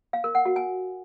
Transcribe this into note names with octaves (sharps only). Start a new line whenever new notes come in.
F5
A#4
F#5
F#4
G#5